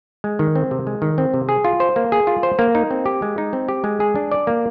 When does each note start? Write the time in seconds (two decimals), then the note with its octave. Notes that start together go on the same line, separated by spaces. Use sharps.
0.24 G#3
0.39 D#3
0.55 C4
0.71 C3
0.87 G#3
1.02 D#3
1.18 C4
1.34 C3
1.49 G#4
1.64 F4
1.80 C5
1.96 A#3
2.12 G#4
2.27 F4
2.43 C5
2.59 A#3
2.75 D#4
2.91 C4
3.06 G4
3.22 G#3
3.38 D#4
3.53 C4
3.69 G4
3.84 G#3
4.00 G#4
4.15 D4
4.32 D5
4.47 A#3